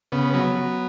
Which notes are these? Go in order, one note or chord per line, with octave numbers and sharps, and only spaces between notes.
C#3 B3
F#3 B3
F#3